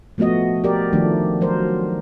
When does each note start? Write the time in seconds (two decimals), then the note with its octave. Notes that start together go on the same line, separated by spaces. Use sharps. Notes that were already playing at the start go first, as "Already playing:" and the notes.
0.18 F3 A3 B3 F#4 D#5
0.64 G4 A#4 D5
0.93 D#3 F3 A3 D4
1.41 F#3 A#4 C5